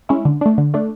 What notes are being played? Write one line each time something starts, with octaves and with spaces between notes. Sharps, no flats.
G#3 C#4 E4
D3
A3 D4
D3
A3 D4